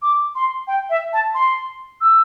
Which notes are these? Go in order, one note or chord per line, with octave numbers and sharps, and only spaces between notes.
D6
C6
G5
E5
A5
C6
E6